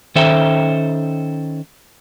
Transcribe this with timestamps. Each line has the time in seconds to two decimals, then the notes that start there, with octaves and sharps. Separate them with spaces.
0.16 D#3 C#4 A4 C5 E5 G5